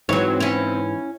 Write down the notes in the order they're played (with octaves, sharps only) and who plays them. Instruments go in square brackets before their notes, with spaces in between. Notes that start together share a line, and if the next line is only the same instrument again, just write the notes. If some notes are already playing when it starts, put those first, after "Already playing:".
[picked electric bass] G#2 E3 [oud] F#3 C#5 [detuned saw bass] C4
[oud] C#4 E4